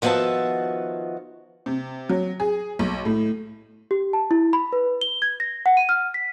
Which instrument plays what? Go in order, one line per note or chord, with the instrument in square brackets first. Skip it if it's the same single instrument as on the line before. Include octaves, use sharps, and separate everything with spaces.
[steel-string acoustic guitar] D#3 F3 B3 F#4 E5 A5
[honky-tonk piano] C3
F#3
G#4
B1
A2
[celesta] G4
A5
E4
B5
B4
G7
G#6
A#6
F#5
D#7
F6
B6